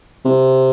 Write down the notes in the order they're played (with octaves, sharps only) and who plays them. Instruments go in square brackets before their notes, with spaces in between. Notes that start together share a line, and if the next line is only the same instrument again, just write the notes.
[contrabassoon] C3